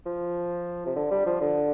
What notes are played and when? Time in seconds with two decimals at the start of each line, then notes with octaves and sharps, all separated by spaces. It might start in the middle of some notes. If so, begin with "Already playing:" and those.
0.06 F3
0.86 C3
0.96 D3
1.11 G3
1.26 F3
1.41 D3